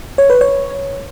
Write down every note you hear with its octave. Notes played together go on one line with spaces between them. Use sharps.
C#5
B4
C#5